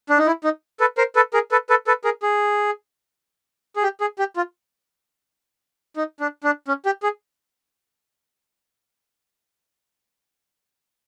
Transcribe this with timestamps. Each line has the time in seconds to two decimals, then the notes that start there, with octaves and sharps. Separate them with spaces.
0.09 D4
0.18 D#4
0.26 E4
0.44 D#4
0.80 A4 B4
0.98 A#4 C5
1.16 A4 B4
1.34 G#4 A#4
1.51 A4 B4
1.69 A4 B4
1.87 A4 B4
2.04 G#4 A#4
2.23 G#4
3.76 G#4
3.83 G4
4.01 G#4
4.19 G4
4.36 F4
5.96 D#4
6.20 D4
6.44 D4
6.68 C#4
6.86 G4
7.03 G#4